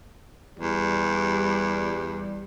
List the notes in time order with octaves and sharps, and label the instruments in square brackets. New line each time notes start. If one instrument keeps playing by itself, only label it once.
[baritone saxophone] E2 [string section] G3